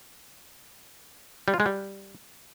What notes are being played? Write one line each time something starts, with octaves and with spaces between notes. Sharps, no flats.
G3
F4
G#3
G3